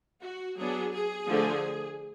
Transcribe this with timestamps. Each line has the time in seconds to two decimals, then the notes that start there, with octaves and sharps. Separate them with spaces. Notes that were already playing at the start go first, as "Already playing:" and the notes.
0.22 F#4
0.57 F#3 B3 D4 G#4
0.92 G#4
1.27 D3 F3 A3 D4